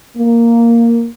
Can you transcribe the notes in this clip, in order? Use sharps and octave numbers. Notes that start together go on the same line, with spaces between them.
A#3